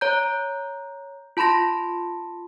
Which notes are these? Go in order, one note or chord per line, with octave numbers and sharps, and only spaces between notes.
C#5 A#5 G6
F4 A5 B5 C6 A#6